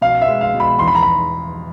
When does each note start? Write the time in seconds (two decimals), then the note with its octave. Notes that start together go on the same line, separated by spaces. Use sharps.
0.01 B2 F5
0.21 E5
0.28 G#3
0.41 F5
0.54 B2
0.60 B5
0.79 E2 C6
0.88 B5
0.95 A#5
1.02 B5